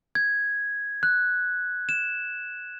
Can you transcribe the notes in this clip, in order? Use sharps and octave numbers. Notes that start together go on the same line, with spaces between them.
G#6
F#6
E7